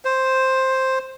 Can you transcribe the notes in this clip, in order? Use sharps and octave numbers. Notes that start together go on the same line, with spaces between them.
C5